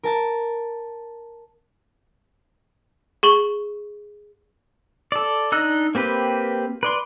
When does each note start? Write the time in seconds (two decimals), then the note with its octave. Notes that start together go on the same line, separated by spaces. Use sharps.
0.03 A#4 A5 A6
3.23 G#4 C#6 F#7
5.12 A4 D5
5.52 D4 D#4 D#5 E6 F#6
5.95 A#3 C4 G4 B4
6.83 B4 D5 C6